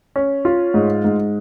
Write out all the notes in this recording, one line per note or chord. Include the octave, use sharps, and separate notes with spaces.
C#4
F4
G#2
G#2